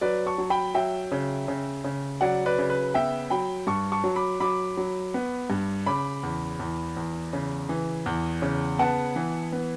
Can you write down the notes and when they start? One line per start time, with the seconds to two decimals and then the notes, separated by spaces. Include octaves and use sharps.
0.01 F#3 B4 D5
0.26 A5 C#6
0.38 F#3
0.50 G5 B5
0.75 F#3 E5 G5
1.12 C#3
1.48 C#3
1.84 C#3
2.21 F#3 D5 F#5
2.46 B4 D5
2.58 C#3
2.70 B4
2.94 B3 E5 G5
3.30 F#3 G5 B5
3.67 G2 A5 C#6
3.92 A5 C#6
4.04 F#3
4.16 B5 D6
4.40 F#3 B5 D6
4.77 F#3
5.14 B3
5.50 G2
5.86 C#3 B5 D6
6.23 E2
6.60 E2
6.97 E2
7.33 C#3
7.69 E3
8.06 E2
8.42 C#3
8.79 B3 F#5 A5
9.16 E3
9.52 B3